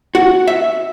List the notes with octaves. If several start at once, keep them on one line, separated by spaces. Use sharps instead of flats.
F#4
E5